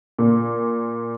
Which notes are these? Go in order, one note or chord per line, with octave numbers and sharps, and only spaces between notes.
A#2